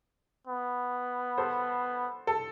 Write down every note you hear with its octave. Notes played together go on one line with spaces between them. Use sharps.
B3
A4 C5
A4